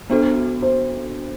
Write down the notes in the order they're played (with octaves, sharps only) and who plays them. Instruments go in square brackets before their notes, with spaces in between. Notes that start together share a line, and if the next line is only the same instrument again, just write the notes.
[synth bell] B3 D4 F#4 A4 [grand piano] C5
[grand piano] C5